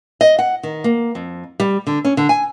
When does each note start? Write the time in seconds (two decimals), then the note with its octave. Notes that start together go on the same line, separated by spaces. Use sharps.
0.21 D#5
0.39 F#5
0.63 D#3
0.84 A#3
1.15 F2
1.60 G3
1.87 D3
2.05 C#4
2.17 D3
2.29 G#5